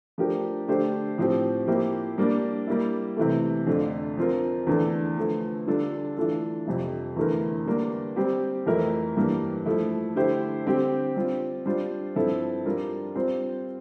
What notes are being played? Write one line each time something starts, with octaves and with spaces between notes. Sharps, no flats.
F3 A3 D4 G4 A#4
D3 A3 D4 G4 C5
A2 F3 C4 G4
F3 A#3 E4 G4 C5
G3 A#3 D4
G3 A#3 E4
C3 E3 A3
F2 D3 A3 D4 F4
F3 C4 F4 A#4
E2 D3 A3 D4 A4
D3 F3 A3
D3 G3 D4 F4 A4
E3 A3 D4 F4 A4
F2 C3 G3
E2 D3 A3 E4 A#4
D3 G3 A#3 D4
G3 C4 G4
F2 E3 A3 E4 A#4
G2 E3 G3 A#3
F3 A3 E4
D3 A3 E4 G4 C5
D3 G3 C4 G4
G3 C4 F4
G3 D4 F4 C5
G2 F3 C4 E4 A4
G3 D4 F4 A#4
G3 C4 F4 C5